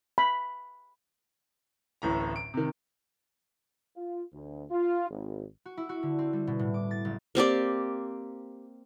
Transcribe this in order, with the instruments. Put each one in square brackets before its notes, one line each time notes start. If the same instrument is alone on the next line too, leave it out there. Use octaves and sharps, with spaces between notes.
[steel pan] B5
[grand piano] D1 A1 A2 A#5
D7
C3 D#3
[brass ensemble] F4
D2
F4
G#1
[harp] F#4
E4
F#4
D3
C4
G3
B2
A2
D6
A6
F#1
[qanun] A#3 C4 G4 D5